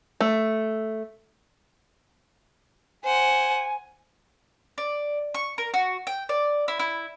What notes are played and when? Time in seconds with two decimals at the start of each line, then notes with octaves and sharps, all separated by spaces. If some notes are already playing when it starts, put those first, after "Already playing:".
0.21 A3
3.04 C5 F#5 G#5
4.78 D5
5.34 C#6
5.58 A#4
5.74 F#4
6.07 G5
6.29 D5
6.68 E4
6.79 E4